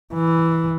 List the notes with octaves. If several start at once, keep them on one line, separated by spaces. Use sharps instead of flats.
E3